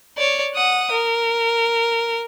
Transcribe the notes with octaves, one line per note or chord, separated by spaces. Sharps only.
C#5 D5
F#5 D#6
A#4